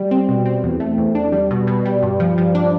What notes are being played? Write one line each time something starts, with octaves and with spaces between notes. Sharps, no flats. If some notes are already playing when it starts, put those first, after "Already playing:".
Already playing: G3
C4
B2
C4
E2
A3
E2
D4
G3
B2
B2
G3
G2
F3
F3
D4